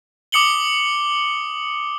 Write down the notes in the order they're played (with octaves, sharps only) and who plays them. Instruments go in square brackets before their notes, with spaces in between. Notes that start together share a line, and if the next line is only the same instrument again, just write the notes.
[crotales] D6 D#6 C#7 F#7 G7